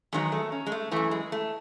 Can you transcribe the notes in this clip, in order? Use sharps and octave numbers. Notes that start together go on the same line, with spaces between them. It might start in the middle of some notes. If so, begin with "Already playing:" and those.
E2 D#3 F#3 G#3
A3
C#4
G#3
A3
F#2 E3 A3
G#3
A3